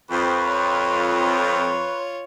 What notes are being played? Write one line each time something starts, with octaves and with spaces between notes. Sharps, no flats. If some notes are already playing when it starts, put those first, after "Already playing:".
F2 B4 C5 C6 C#6
F4 C#5